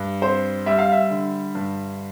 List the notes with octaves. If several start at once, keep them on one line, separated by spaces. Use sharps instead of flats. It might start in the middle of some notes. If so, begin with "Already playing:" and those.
Already playing: G2
C4 C5
G3 E5
F5
E5
D3
G2